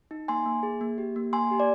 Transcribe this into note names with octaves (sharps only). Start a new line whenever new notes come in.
D#4
A#3 G#5 C6
A#3
G#4
A#3
G4
A#3
A#3 G#5 C6
G4
D5